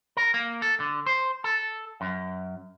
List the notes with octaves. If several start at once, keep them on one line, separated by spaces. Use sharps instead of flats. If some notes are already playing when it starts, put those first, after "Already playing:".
A#4
A#3
A4
D3
C5
A4
F#2